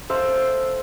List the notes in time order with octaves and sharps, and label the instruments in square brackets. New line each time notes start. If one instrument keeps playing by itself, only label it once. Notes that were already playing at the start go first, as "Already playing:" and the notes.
[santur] A4 C5 E5 F5